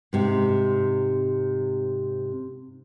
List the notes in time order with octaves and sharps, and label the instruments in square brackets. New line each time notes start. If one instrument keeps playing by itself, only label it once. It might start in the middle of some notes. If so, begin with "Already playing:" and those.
[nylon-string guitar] G#2 C3 C4